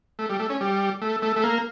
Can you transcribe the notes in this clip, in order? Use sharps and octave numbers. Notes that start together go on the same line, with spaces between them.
A3
G3
A3
C#4
G3
A3
A3
A3
A#3